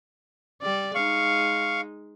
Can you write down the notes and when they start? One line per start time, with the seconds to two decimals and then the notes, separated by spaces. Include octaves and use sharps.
0.62 G3 D5
0.95 G#3 D#4 F5 C#6